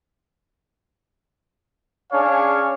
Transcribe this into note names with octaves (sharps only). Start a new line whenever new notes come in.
C#4 D4 G#4 C#5 F5